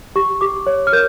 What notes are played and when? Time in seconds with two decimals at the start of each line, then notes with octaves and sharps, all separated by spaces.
0.16 G4 C#6
0.41 G4 D6
0.67 C#5
0.87 F6
0.93 A#4 G6